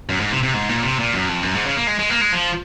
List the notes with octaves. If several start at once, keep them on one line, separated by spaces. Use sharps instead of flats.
F#2
G#2
C3
C3
G#2
A#2
C3
A#2
F#2
F2
F#2
G#2
C#3
A#3
G#3
G#3
A#3
G#3
F3